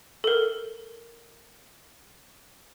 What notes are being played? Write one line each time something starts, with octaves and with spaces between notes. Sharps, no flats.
A4 A#4